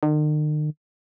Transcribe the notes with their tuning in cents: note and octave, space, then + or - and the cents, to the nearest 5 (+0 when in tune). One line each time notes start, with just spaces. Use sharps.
D#3 -45